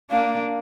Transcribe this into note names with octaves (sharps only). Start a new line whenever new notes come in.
A#3 D4 F5